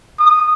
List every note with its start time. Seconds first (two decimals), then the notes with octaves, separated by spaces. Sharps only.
0.19 D#6